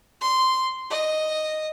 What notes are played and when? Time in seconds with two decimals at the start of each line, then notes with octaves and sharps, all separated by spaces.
0.21 C6
0.90 D#5